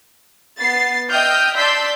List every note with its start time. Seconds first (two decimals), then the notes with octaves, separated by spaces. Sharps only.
0.58 B3 A6 C7
1.09 D#5 E5 G5 D#6 F6 G6
1.56 D5 A5 C6 E6 G6 B6